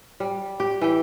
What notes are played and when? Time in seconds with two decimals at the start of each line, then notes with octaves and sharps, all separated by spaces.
0.20 G3
0.60 G4
0.81 E3 G5